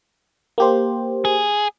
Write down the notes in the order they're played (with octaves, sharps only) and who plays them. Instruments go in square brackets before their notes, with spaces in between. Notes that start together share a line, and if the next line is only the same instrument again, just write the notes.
[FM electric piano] A#3 G4 C5
[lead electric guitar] G#4